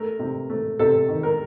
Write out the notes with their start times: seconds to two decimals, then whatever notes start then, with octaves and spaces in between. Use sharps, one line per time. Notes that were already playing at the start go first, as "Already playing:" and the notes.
Already playing: A3 A#4
0.19 C3
0.50 A3
0.79 C3 A4
1.08 D#3
1.23 A#4